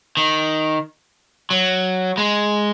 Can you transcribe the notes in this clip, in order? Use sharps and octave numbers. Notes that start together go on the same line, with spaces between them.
D#3
F#3
G#3